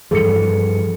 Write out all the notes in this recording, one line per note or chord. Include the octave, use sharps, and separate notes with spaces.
G2 E3 F3 G#4 A4 C#7